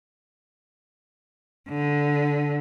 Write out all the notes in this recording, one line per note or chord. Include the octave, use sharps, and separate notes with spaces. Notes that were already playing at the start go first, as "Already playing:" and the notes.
D3